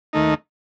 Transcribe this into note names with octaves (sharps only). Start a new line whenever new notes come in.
D#2 D#3 A3 D#4